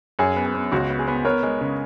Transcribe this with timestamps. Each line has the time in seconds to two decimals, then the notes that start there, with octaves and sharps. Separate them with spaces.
0.19 F#2 G#4
0.36 B3
0.45 G#4
0.55 B3
0.72 C#2 F#4
0.90 B3
0.99 G#4
1.08 B3
1.25 B3 A#4 C#5
1.43 G#3
1.61 C#3